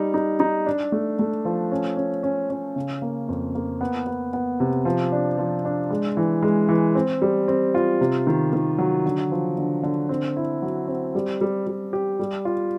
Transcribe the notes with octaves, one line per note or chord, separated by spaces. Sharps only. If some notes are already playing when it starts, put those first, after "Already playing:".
Already playing: G3 D#4
D#4
D#4
D4
A3
A3
F3
C#4
C#4
C#4
C#4
C#3
A#3
F2
A#3
B3
B3
B3
C3
F3
D4
F3
D4
G#3
E3
G#3
E3
C4
G3
C4
F4
C3
D#3
D#3
F#3
D3
F3
D3
D3
C4
E4
F#3
C4
G3
G3
G3
G4
G3
F4